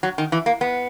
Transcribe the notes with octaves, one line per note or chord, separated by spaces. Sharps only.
F#3
D#3
E3
A#3
B3